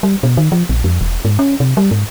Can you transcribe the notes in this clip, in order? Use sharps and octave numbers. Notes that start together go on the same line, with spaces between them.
G3
B2
D#3
F3
A#1
F2
E1
G#2
C#4
C3
G3
G#2